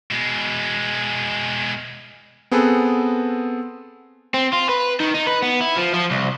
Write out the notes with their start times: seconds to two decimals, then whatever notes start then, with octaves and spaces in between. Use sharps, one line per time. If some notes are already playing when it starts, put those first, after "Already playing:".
0.11 B2 G#3
2.51 B3 C4 G#4 A4 B4
4.34 C4
4.53 F4
4.69 B4
5.00 D#3
5.14 D#4
5.27 B4
5.42 B3
5.61 E4
5.77 F3
5.94 F3
6.11 C2